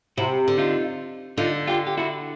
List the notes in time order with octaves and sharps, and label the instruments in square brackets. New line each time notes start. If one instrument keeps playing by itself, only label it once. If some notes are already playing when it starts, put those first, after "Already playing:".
[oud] C3 [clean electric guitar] E4 F#4
[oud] D3
[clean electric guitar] D#4 F4
[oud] D3 [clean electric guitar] D#4 F4
[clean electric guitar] F4 G4
G4
E4 F#4